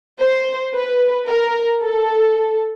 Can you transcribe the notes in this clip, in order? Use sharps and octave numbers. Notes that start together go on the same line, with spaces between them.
C5
B4
A#4
A4